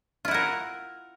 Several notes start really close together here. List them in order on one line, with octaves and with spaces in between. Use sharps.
F4 E4 F#5 A#4